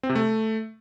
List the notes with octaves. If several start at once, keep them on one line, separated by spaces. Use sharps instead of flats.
C4
C3
A3